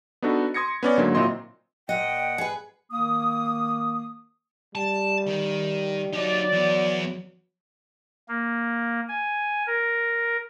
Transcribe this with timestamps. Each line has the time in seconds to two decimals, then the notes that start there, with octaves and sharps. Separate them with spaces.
0.22 B3 D4 D#4 F#4 A4 B4
0.54 C6 D#6 G#6 A#6 C#7
0.83 B3 C#4 D5
0.98 G#2 D3 F#3 A#3
1.15 A#2 F#3 C4 E4 D#5 C6
1.89 A#2 D#5 F#5 G5
2.38 G#4 B4
2.91 D#3 A#3 D#6
4.75 G3 A5
5.27 D#3
6.13 F#3 D#4 G4 D5
6.52 E3 B3
8.28 A#3
9.08 G#5
9.67 A#4